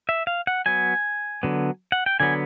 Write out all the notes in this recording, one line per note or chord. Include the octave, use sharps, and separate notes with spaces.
E5
F5
F#5
F#3 B3 G#5
D3 F#3 B3
F#5
G5
D3 F#3 B3 G#5